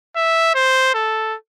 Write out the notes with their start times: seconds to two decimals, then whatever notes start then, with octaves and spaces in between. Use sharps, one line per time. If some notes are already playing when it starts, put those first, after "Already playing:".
0.16 E5
0.55 C5
0.94 A4